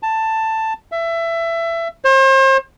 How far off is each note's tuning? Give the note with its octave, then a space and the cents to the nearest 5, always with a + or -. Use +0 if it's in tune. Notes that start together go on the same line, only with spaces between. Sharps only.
A5 +10
E5 +20
C5 +40